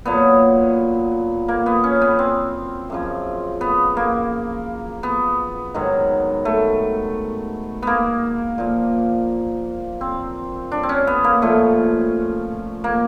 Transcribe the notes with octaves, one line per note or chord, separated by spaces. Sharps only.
A#2 F#3 B3
A#3
B3
C#4
B3
C4
F#2 C#3 F3
B3
A#3
B3
G#2 D#3 F#3
A3
A#3 B3
A#2 F3
C4
D4
C4
C#4
B3
A#3
A#2 F3 A3
A#3